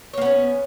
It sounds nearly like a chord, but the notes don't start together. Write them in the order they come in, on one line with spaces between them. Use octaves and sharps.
C#5 A#3 B3 C#4